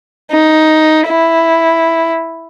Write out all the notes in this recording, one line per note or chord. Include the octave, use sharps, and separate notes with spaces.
D#4
E4